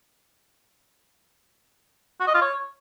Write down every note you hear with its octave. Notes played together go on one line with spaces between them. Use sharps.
F#4
D#5
F4
C#5